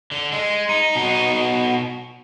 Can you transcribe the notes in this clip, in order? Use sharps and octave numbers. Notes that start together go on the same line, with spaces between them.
D3
G#3
D#4
B2 D#4